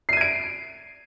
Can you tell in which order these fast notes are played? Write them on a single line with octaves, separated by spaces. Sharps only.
C7 D#7 G#6 D7